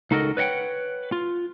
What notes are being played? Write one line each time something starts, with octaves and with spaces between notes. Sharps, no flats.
C#2 D#4 F#4 A4 A#4 D#5
B4 C#5 D#5 F#5 G5
F4